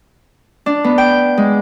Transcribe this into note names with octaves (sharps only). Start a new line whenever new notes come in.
D4
B3
G5
G#3